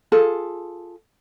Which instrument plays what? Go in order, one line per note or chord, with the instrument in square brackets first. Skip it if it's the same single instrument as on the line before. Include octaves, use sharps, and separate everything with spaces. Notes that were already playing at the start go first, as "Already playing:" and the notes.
[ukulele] F4 G#4 A4